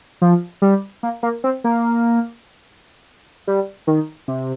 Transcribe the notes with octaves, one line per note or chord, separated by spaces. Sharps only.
F3
G3
A#3
A#3
C4
A#3
G3
D#3
C3